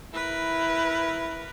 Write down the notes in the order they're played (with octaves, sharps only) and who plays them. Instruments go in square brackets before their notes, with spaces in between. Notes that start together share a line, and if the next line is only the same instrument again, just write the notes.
[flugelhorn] E4 [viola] A#4 B4